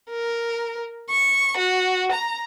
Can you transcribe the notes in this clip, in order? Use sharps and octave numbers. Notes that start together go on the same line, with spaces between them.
A#4
C#6
F#4
A#5